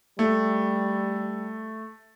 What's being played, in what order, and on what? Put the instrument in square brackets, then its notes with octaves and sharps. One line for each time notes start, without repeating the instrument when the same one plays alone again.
[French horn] G3 [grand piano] A3